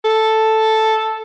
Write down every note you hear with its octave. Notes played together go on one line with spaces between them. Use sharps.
A4